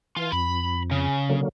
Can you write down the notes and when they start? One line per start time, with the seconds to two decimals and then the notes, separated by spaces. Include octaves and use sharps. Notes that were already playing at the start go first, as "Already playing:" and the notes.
0.16 E3 F4 G#5
0.32 F2 B5
0.91 C#3
1.30 D3 F#3 A#3